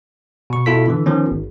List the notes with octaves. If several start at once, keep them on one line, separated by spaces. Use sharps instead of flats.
B2 C#6
B2 E4 F4 A4 B6
D3 E3
D#3 F3 B3 C#4
G#1